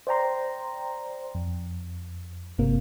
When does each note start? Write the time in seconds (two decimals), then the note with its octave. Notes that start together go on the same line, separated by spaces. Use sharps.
0.07 C5 D5 G5 A#5 C6
1.35 F2
2.58 G1 C3 A#3